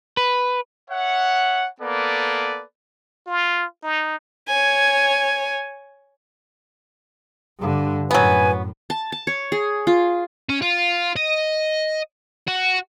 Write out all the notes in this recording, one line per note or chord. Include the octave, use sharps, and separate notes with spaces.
B4
C#5 E5 F#5
A#3 B3 A4 B4 D5
F4
D#4
C#5 G#5
G2 D3
F#2 A2 F#3 B3 B4 G#5
A5
A5
C#5
G#4
F4
C#4
F4
D#5
F#4